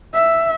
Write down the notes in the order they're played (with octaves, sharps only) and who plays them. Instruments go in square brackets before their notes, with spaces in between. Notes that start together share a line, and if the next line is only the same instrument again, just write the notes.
[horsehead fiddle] E5